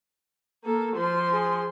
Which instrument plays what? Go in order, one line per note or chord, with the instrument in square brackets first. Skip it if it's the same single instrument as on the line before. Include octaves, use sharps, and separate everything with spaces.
[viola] A#3 A4
F3 C6
[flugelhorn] G#4